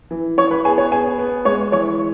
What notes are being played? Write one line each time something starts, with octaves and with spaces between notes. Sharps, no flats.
E3
E3 C#5 C#6
B4 B5
B3 G#4 G#5
C#5
B3 G#4 G#5
B3
G#3 C#5 C#6
E3 C#5 C#6